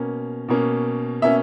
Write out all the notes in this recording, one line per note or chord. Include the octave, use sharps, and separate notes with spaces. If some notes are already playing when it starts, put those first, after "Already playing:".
Already playing: B2 A#3 C#4
B2 A#3 C#4
B2 A#3 C#4 E5